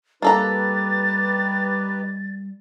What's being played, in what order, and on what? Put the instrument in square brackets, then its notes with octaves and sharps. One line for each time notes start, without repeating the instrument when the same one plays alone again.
[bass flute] G3 [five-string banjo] A#3 A4 A#5 [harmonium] D#4 G4 B4 [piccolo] A6